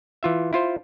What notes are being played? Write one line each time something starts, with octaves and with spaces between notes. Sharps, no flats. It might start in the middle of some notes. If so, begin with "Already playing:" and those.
E3 F4 E5
E4 F4 C5